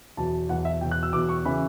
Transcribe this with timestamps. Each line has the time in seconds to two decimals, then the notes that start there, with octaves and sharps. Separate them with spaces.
0.17 E2 B2 F#3 A5
0.49 E2 B2 F#3 F#5
0.65 E5
0.81 E2 B2 F#3 G5
0.91 F#6
1.03 E6
1.13 E2 B2 F#3 D6
1.29 C#6
1.45 C#3 E3 B5